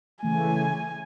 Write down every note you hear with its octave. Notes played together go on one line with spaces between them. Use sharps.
C#3 E3 A3 G#5